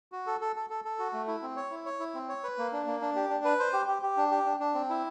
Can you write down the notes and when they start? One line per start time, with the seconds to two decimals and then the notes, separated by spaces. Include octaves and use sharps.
0.12 F#4
0.27 A4
0.41 A4
0.56 A4
0.70 A4
0.85 A4
0.99 F#4
1.13 A3
1.27 E4
1.42 C4
1.57 C#5
1.71 E4
1.86 C#5
2.00 E4
2.15 C4
2.29 C#5
2.44 B4
2.58 A#3
2.72 D4
2.87 A#3
3.01 D4
3.16 G4
3.30 D4
3.45 B4
3.60 C5
3.73 G4
3.88 G4
4.02 G4
4.17 D4
4.31 G4
4.46 D4
4.60 D4
4.74 C4
4.89 E4